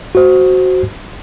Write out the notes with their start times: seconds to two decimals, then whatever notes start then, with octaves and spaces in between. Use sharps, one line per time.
0.15 F#4 C5